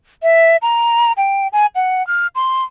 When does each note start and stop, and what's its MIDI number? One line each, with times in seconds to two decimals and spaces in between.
0.23 0.57 76
0.62 1.12 82
1.17 1.48 79
1.53 1.66 80
1.75 2.05 78
2.07 2.27 89
2.35 2.64 84